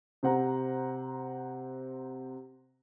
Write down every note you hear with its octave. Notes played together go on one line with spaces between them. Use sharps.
C3 C5 F#5 A#5